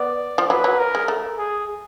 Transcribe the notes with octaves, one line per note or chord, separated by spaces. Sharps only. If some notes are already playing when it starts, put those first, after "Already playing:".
Already playing: B3 D5
F3
F#3 B4
F#3
A#4
G#3
A3
G#4